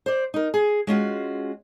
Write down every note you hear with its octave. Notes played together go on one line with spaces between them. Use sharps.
C5 D5
D#4 A#4
G#4
G#3 C#4 F4 F#4